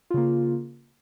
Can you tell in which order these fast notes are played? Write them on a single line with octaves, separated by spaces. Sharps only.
F4 C#3 A#3